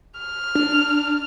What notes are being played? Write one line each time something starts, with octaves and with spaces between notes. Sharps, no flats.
F6
D4